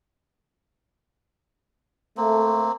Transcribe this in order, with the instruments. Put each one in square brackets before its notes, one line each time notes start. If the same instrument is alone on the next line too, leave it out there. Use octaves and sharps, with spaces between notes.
[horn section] A3 [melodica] A#3 C4